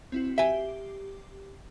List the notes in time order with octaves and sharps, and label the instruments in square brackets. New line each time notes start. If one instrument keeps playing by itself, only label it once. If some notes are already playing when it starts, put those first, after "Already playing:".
[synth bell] C4 E4 F#4
[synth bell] G4 C7 [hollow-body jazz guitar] E5 G#5